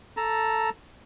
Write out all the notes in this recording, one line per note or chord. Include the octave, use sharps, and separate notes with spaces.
A4 A5 A#5